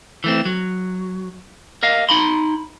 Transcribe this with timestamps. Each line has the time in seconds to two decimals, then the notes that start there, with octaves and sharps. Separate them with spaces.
0.24 E3 A3 C4
0.46 F#3
1.83 A#4 D#5 F5
2.09 D#4 B5 C6